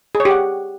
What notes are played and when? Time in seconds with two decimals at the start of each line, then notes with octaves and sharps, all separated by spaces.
0.15 G#4
0.20 C#5
0.25 G4
0.31 F#5